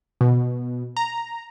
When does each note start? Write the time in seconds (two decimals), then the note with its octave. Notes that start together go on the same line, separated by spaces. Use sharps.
0.21 B2
0.97 A#5